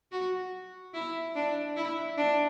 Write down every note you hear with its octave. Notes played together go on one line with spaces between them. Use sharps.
F#4
E4
D4
E4
D4